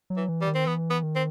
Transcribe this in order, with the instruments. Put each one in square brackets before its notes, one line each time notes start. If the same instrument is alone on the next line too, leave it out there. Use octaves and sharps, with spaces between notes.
[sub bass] F#3
[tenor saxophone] E3
[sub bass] E3
[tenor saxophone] G3
[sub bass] D#3
[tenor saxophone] C4
[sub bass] E3 [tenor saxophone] B3
[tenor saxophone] B3
[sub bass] D#3
[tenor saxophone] C4